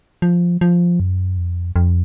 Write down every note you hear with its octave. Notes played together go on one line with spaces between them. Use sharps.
F3
F3
F#2
F2
F2